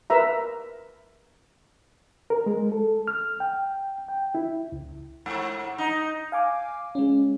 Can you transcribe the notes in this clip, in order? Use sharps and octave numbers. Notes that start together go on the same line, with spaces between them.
A#4 B4 E5 A#5
A#4
G#3
A4
F6
G5
G5
E4
C#2
G#2
D#4
F5 G#5 D6
G#3 C#4